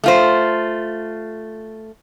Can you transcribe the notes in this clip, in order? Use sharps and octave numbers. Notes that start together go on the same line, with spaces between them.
A3 F4 C5